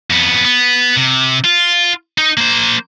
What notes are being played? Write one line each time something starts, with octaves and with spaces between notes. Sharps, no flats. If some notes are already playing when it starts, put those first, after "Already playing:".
F2 B3
B3
C3
F4
D#4
A#3 C5